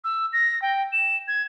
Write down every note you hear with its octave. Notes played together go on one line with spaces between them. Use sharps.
E6
A#6
G5
E7
G#6